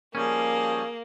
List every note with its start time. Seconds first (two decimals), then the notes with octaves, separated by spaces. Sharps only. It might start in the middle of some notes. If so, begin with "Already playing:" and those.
0.15 F3 G3 A#3 C#4 G#4